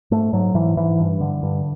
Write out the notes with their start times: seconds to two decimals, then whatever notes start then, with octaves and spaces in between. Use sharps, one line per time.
0.11 G#2 A3
0.33 G#2 F#3
0.54 G#2 E3
0.77 G#2 E3
0.99 G2
1.20 D3
1.43 G2